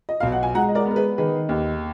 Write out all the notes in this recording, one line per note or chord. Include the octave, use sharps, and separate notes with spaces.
D#5
B1 F5
F#5
G#5
G#3 F#5 A#5
D#5
A#4 D5
B3
A#4
G#4 B4
D#3 G#4 B4
D#2